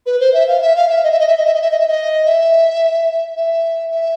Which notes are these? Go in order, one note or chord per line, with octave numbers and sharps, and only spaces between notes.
B4
C5
E5
F5
E5
F5
E5
D#5
E5
D#5
E5
D#5
E5
D#5
E5
D#5
E5
D#5
E5
E5
E5